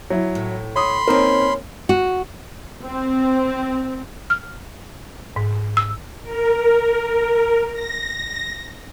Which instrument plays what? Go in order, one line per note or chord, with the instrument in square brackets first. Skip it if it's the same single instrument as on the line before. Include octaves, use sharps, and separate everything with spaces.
[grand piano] F#3 E4
[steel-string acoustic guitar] A2
[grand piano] C#5 D#6 [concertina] B5 C6
[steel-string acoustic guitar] A#3 C#4 [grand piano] C4 D#4 A#4
[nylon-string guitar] F#4
[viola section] C4
[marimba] F6
G#2
E6
[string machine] A#4
A#6